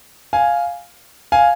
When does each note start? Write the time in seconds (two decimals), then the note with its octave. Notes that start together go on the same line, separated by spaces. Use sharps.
0.33 F5 G#5
1.32 F5 G#5